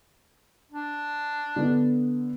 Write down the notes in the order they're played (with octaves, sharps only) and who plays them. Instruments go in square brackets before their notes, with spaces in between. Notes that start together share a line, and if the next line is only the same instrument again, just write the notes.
[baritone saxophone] D4
[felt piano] D3 B3